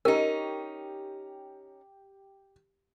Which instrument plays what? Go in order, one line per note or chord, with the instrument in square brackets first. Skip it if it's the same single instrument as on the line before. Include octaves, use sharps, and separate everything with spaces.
[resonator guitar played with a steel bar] C#4 D#4 [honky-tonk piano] G4 [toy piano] A#4